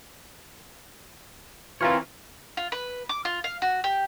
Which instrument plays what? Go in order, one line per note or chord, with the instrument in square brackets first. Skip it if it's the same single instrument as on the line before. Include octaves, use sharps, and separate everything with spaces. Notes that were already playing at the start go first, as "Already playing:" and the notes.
[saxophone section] E3 F4 [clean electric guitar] C4 A#4 C#5
[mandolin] F4
B4
D6
F4
F5
F#4
G4